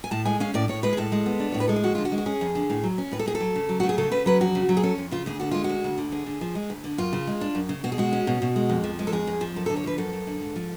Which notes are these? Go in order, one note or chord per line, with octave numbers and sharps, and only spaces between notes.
G#5
A2 A5
G#3 G#5
C#4 F5
A2 D5
A2 C#5
G#3 B4
G#4
A2 A4
G#3
B3
D4
A2 C#5
B4
G#3 A4
G#4
F2 F#4
D3 F4
F#4
G#3
F#4
C#4 G#4
F2
D3
A2
F#3
C#4
A2 B4
A4
A2 G#4
A4
F#3
C#3
F#3
A3 F#4
G#4
C#3 A4
C#3 B4
F#3 B4
F2 F#4
C#3
F#3
G#4
C#4 A4
F2
C#3 F4
D2 G#4
D3 F#4
G#3 F4
F#4
D2
D2
D3
D2 G#4
D3
F3
G#3
D2
D3
F#2 F4
C#3
G#3
D4
F#2
C#3
B2 F#4
G#4
G#3 F#4
C#4
B2
B2
G#3
F2
F3
G#3
A4
F2 G#4
F2
F3
F#2 A4
A4
D3
C#5
F3 B4
F#2 A4
F#2
D3
G#2
F3